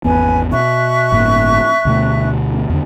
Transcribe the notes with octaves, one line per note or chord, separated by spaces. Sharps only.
G#1 E2 B3 B4 G#5
B2 E5 C#6 F#6
G1 A2 A#3
D2 B2 A3
E2 D3